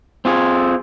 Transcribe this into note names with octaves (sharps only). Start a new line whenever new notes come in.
C4 F4 G#4